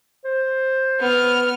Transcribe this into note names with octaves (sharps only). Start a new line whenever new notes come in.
C5
B3 F6